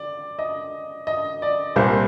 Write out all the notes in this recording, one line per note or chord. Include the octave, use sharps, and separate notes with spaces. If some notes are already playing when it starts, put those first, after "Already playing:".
Already playing: D5
D#5
D#5
D5
C2 A#2 G3 C5